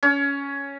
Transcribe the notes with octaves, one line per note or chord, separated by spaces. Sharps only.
C#4